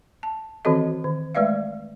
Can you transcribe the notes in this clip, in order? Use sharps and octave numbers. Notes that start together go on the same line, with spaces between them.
A5
D#3 E3 C4 F#4 A4 D#5
D#3
G#3 A3 B4 D5 E5 F5